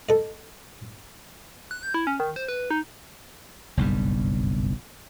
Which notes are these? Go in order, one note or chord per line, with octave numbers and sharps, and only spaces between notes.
A4 D#5
F#6
G6
E4
C#4
D#3
C5
B4
D#4
F#1 B1 G2 G3